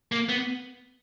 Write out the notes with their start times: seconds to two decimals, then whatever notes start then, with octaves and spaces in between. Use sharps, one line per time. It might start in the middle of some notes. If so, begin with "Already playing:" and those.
0.12 A#3
0.29 B3